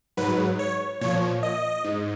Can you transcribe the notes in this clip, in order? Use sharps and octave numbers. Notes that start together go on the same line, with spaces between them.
G#2 F#3 B4
C#5
A#2 F3 C#5
D#5
G#2